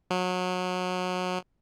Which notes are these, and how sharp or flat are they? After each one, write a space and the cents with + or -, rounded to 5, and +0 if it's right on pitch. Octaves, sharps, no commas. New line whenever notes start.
F#3 -25